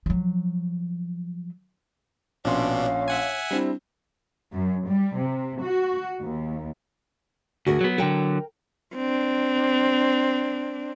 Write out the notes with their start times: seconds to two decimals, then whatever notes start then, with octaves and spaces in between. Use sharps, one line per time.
0.06 F3 F#3
2.45 A#1 B2 C#4 D4 C#5 F5 C6
3.08 E5 F#5 G#5
3.51 G3 C4 D4 E4
4.53 F#2
4.87 G3
5.18 C3
5.61 F#4
6.22 D#2
7.67 D2 F#4 G#4 A#4
7.81 F#3 B3
7.98 D3 F#3 A#4 G5
8.95 C4 D4